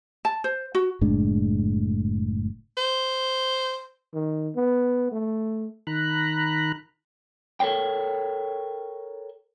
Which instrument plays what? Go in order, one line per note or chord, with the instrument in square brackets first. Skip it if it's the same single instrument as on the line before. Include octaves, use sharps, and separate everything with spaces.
[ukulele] A5
C5
F#4
[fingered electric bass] F#1 A2 G#3 D4
[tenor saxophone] C5
[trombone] D#3
B3
A3
[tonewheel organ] D#3 A#5 B5 F#6
[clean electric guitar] A4 A#4 C5 C#5 G5